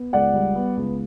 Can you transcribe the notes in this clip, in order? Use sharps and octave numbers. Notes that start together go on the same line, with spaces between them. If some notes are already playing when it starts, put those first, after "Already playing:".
Already playing: B3
C#2 D5 F#5
G3
B3
C#2